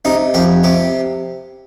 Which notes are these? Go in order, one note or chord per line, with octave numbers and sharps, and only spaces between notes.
C3 D#4
F2 G4
C3 G4